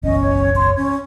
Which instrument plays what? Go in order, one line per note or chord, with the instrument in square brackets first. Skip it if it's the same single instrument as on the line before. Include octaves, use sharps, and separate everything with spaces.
[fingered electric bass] F#1 B1 E2 [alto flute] C#4 [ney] D#5
[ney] C#5
[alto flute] C6
C#4